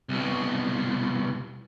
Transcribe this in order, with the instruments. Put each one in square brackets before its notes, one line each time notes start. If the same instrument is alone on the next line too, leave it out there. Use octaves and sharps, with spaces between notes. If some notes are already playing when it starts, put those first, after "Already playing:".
[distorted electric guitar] C2 B2